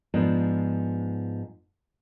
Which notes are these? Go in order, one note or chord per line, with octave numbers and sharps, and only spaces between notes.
G#2 F3 B3 D4